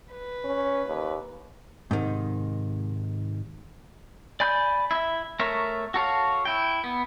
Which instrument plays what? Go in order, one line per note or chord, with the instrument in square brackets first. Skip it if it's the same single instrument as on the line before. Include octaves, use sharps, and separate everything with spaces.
[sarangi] B4
[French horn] C#4
D#2
[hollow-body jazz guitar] G#2 C3 D#3
[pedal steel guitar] D5 G#5 B5 G6
E4 E5
A3 A#4 C#5 E5
F#4 A4 C#5 F5
E4 G5
B3